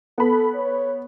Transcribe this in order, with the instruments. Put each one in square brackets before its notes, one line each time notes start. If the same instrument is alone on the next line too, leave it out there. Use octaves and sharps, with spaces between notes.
[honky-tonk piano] B3 B5 [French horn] A4
[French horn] C#5